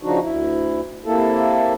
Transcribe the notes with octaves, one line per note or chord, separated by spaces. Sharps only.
C#3 F3 D4 D#4 F#4
D2 E4
C3 A#3 E4 A4